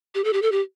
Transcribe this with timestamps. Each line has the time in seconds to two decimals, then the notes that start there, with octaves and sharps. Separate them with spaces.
0.15 G4
0.24 A4
0.33 G4
0.42 A4
0.52 G4